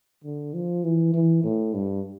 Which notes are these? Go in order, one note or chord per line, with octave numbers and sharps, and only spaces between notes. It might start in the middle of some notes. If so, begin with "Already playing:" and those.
D3
F3
E3
E3
A2
G2